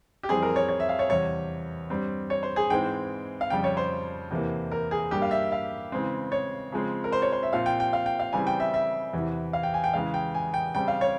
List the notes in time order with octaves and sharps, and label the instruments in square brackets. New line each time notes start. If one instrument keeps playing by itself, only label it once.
[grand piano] G4
F2 E3 G3 C4 G#4
A#4
C#5
C#5
E5
F5
C#5
E2 C3 G3 C#5
G2 G3 C4
C#5
C5
G#4
G#2 E3 G#3 C4 G5
F5
F2 C#3 G3 G5
C#5
C5
E2 C3 E3 A#3
A#4
G#4
G2 G3 A#3 G4
F5
E5
F5
C#3 E3 G#3 C4
C#5
C#3 F3 G#3 C4
A#4
C5
C#5
C5
E5
A#2 F3 C4 F5
G5
G5
F5
G5
F5
C#3 E3 G3 C4 G#5
G5
E5
E5
E2 C3 E3
F5
G5
G#5
G5
E2 C#3 E3 G#3 F5
G5
G#5
G5
C#3 G3 C4 G5
F5
C#5